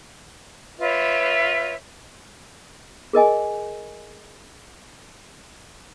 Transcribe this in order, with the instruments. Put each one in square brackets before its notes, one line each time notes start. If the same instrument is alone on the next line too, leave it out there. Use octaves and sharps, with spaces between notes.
[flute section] F4 B4 C#5 E5
[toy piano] G#4 A#4 D#5 G#5